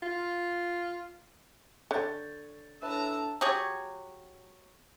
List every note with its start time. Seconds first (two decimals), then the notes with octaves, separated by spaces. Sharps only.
0.03 F4
1.91 D3 C#5 G6 A6
2.82 A2 D4 B4 E5 A5 A#5 E6
3.41 F#3 G4 G#4 C#5